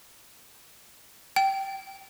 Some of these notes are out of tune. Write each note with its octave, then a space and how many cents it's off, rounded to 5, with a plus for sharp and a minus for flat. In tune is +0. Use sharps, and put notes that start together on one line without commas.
G5 -10